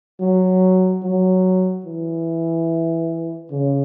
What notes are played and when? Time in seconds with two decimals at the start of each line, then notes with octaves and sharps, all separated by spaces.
0.20 F#3
1.03 F#3
1.86 E3
3.52 C#3